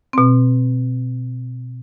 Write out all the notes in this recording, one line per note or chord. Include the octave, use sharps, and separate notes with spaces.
B2 C4